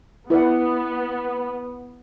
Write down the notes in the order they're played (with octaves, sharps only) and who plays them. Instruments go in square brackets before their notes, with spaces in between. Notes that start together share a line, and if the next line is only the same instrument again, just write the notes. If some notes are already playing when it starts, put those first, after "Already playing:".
[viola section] B3 [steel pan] E4 B4 D5 F#5